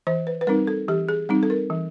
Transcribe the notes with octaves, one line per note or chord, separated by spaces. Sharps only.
E3 C5
B4
B4
G3 C4 D#4 A#4
A4
E3 G4
G#4
G3 C4 D#4
A4
A#4
E3